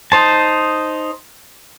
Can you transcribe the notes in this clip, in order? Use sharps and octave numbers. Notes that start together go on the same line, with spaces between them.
D#4 C5 A5